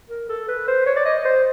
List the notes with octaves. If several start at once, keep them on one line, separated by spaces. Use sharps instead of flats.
A#4
A4
B4
C5
C#5
D5
D#5
C5